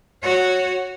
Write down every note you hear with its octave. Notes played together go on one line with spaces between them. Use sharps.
F#4 C#5